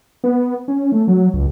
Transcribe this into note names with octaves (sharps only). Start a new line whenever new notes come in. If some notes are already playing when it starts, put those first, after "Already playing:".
B3
C#4
A3
F#3
C#2